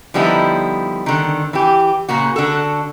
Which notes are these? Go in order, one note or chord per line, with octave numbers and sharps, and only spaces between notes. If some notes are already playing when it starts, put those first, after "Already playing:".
D3 F3 G3 B3 D#4 E4
D3 D#3
E3 G4
A#2 C#3 A#3 F#4
D3 F#4 A4